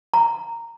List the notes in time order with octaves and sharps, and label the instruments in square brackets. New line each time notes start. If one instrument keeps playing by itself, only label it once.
[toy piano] A#5